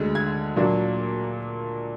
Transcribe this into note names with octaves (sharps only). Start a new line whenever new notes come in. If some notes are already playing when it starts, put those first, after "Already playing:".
Already playing: D2 D3 G#3
G#6
A#2 F#3 A#3 D4